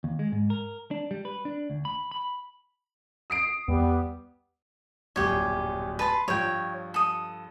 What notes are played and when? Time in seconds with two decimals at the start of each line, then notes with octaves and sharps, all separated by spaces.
0.04 D#2
0.19 G#3
0.32 G#2
0.50 A#4
0.91 D4
1.11 G3
1.25 B4
1.45 D4
1.70 D2
1.85 B5
2.11 B5
3.30 D#6 C7 D7
3.68 E2 G3 B3
5.16 D1 A#1 F#2 G4 C#5
5.99 B4 A5 C6
6.28 G2 F3 C#5 G5
6.94 A4 D#6